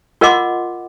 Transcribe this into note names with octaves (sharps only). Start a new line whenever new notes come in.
F4 A#4 D#5 F#5 C6 D6